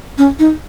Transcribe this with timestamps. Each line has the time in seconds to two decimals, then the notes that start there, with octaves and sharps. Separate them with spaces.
0.18 C#4
0.39 D#4